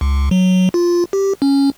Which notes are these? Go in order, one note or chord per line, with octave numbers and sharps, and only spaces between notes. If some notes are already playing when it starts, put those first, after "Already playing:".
C#2
F#3
F4
G4
C#4